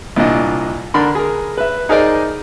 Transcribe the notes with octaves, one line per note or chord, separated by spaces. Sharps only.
C2 A#2 D4 D5 D#5
D3 D4 A4 A#4 B5 C6
G#4 A#4
B4 E5
D#4 G#4 A#4 C5 D5 D#5